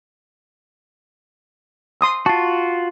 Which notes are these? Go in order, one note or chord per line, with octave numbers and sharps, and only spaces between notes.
C6 D#6 E6
F4 F#4 A5